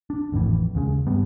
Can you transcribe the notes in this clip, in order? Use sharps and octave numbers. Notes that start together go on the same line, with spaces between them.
D4
G#1 F2 A2 E3
D#2 C#3 G#3
F#1 G2 G3 B3